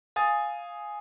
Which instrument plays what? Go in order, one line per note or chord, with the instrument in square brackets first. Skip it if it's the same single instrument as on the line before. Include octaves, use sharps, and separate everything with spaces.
[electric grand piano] F5 G#5 D#6 A6